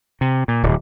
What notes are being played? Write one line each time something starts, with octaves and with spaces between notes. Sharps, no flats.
C3
A#2
D1